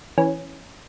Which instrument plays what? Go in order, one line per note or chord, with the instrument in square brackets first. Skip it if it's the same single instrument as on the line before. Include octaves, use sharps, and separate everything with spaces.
[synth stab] E3 C#4